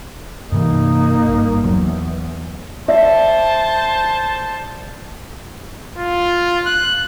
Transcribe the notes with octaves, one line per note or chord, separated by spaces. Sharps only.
G2 C3 E3 A#3 D#4
G#1 G2
E2 F#3
C5 D5 E5 A5
F4
F#6